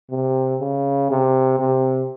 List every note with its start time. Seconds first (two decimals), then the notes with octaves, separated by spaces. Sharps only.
0.11 C3
0.61 C#3
1.10 C3
1.59 C3